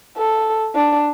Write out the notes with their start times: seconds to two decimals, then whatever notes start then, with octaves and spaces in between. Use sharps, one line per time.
0.17 A4
0.75 D4